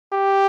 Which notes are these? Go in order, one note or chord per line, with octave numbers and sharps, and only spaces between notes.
G4